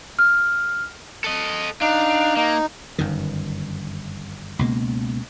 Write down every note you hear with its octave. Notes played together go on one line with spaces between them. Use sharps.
F6
A4 D#5
D4 D#4 F5
A#3 D#4
G1 F#2 D#3
C#2 B2 A#3